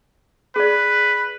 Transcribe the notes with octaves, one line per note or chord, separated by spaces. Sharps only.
G#4 B4 D5